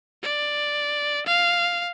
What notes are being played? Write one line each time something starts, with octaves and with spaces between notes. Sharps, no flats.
D5
F5